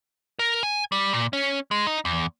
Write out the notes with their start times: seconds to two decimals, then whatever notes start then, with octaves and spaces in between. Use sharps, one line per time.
0.39 A#4
0.63 G#5
0.92 G3
1.13 A#2
1.33 C#4
1.71 G#3
1.87 D#4
2.05 E2